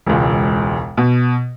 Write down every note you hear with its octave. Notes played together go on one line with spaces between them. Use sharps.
E1 C#2
B2